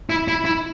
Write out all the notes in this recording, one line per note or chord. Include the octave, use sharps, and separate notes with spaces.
E4
E4
E4